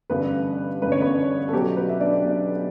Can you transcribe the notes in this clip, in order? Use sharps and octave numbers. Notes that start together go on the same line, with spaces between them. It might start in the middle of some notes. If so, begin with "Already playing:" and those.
A1 G2 D3 G3 B3 B4
A1 G2 D3 G3 B4
C#5
B3 B4
A4
B1 B2 F#3 G4
B3 B4
E5
D4 D5
B1 B2 F#3